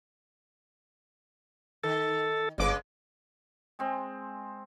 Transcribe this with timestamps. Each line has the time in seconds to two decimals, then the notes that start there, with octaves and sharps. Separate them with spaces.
1.84 D#3 A4
2.58 G1 C#3 G#3 B4 D6
3.79 G#3 C4